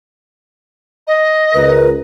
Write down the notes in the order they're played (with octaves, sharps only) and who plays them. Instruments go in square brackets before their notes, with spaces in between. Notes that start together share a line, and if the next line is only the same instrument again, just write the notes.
[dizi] D#5
[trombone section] C#2 A#4 [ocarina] B4